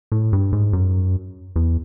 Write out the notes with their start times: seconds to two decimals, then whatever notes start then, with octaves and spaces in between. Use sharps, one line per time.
0.12 A2
0.33 G2
0.53 G#2
0.73 F#2
1.56 E2